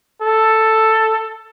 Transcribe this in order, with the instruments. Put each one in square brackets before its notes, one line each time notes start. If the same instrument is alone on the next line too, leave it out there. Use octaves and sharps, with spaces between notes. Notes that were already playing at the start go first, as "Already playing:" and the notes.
[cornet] A4